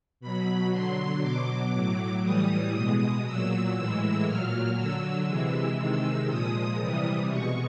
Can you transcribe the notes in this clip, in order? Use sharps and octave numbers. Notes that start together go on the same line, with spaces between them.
B2 F#3 B5
D3 F#3 C6
B2 F#3 D6
A2 F#3
A2 E3 G3 D#6
B2 G#3 D#6
A#2 F#3 E6
A2 E3 G#3 E6
A#2 F#3 F6
D3 F#3 E6
C3 E3 G#3
C3 D#3 G#3 E6
A#2 F3 G#3 D#6
C3 E3 G3
B2 G#3 C#6